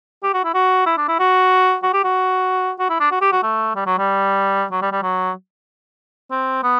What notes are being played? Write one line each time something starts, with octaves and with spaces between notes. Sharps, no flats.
G4
F#4
E4
F#4
E4
D4
E4
F#4
F#4
G4
F#4
F#4
E4
D4
F#4
G4
F#4
A3
G3
F#3
G3
F#3
G3
G3
F#3
C4
B3